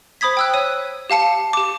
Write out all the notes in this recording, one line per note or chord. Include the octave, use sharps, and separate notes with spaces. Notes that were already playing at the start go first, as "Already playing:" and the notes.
C5 B5 D#6 G#6 B6
G5 E6 F#6
C#5 D#7
G4 F5 A5 C#7
G4 D6